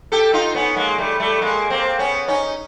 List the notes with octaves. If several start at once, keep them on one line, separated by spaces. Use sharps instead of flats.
G4 A4
D#4 F4
B3 C#4
G#3 A#3
G3 A3
G3 A3
G#3 A#3
A#3 C4
B3 C#4
C#4 D#4